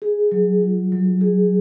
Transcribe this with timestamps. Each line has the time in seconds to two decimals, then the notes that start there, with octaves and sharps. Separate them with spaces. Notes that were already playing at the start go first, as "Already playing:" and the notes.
0.02 G#4
0.32 F#3
0.62 F4
0.92 F#3
1.21 G#4